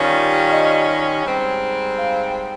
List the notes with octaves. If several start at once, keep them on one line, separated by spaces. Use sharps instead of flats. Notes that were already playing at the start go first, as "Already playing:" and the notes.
Already playing: D#2 D#3 G3 C#4 F4
D#5
G#2 G3 C4
F5